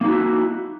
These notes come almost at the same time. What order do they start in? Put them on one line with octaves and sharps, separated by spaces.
A#3 D#4 F#4 E4